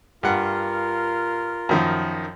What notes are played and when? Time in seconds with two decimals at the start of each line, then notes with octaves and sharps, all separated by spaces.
0.23 G2 F4 A#4 F#5
1.69 F#2 D#3 F3